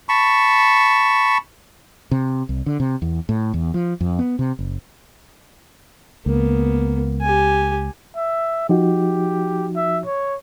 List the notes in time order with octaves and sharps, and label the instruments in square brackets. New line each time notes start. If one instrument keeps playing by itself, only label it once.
[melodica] A5 B5 C#6
[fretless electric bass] C3
C2
D3
C3
E2
A2
E2
F3
F2
B3
C3
F#1
[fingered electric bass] C#2 [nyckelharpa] A#3 B3
[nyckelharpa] G4 G#5
[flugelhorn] E5
[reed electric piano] F3 D#4 F#4 [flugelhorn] G4
[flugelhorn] E5
C#5